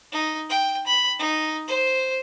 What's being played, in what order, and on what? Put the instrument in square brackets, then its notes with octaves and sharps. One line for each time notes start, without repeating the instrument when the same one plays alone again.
[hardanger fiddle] D#4
G5
B5
D#4
C5